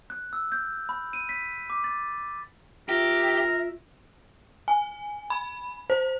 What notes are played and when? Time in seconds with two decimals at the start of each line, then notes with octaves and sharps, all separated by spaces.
0.10 F#6
0.33 E6
0.52 G6
0.89 B5
1.13 D#7
1.29 B6
1.70 D6
1.84 A6
2.89 F4 G4 A#4 E5
4.68 G#5
5.30 B5
5.90 C5